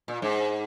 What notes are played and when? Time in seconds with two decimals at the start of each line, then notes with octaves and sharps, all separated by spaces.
0.08 A#2
0.22 G#2